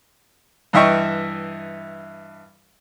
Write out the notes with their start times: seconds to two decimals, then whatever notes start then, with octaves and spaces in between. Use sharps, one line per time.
0.73 G2 E3 D#5 E5 G5 C#6